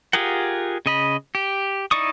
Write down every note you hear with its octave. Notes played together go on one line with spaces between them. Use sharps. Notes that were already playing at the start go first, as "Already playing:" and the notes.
F4 G4 G#4 A#4 F#5
C#3 D#5 B5
G4
D#4 E4 D5 C#6 D#6